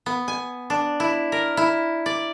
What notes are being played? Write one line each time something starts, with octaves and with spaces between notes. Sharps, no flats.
B3
G#5
D4
E4
A#4
E4
D5